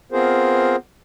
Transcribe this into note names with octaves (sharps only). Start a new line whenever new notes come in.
B3 C4 F4 G#4 A#4 C5